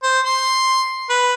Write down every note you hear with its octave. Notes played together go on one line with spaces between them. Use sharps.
C5
C6
B4